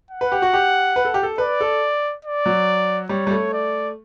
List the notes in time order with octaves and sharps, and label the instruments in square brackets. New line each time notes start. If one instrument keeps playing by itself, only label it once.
[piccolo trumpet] F#5
[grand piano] B4
G4
F#4
G4
B4
A4
G4
A4
[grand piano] B4 [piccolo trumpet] D5
[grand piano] A4
[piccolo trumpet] D5
[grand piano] F#3
[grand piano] G3 [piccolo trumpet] C#5
[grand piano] G3
A3
[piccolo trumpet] D5